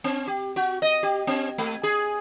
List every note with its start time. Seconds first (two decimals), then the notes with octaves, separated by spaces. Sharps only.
0.04 C4
0.27 G4
0.56 F#4
0.82 D#5
1.03 G4
1.27 C4
1.58 A3
1.83 G#4